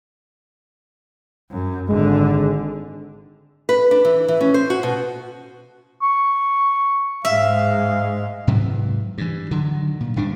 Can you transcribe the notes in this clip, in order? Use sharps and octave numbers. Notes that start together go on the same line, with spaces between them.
F#2
G#1 D3 G#3
B4
D4
E3
E3
C#4
C5
F#4
B2
C#6
G#2 G#3 E5 F5
G#2 C3 E3 F#3
G2 E3
D3 D#3 F#3
A#2
D#1 G2 D4